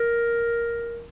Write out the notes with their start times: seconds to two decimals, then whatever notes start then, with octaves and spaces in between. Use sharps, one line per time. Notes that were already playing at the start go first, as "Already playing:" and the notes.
Already playing: A#4